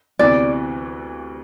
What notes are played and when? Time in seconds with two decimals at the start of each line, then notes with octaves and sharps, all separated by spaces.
0.19 D2 C3 E3 B3 D5